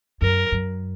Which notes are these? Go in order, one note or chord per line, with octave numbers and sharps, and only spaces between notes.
F#2 A#4
F#2